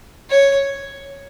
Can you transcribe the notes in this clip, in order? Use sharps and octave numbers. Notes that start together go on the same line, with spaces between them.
C#5